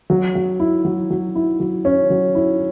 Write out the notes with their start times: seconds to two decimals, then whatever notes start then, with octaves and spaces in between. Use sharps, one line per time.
0.10 F#3
0.35 F#3
0.60 E4
0.85 F#3
1.10 F#3
1.35 E4
1.60 F#3
1.85 C#4
2.10 F#3
2.35 E4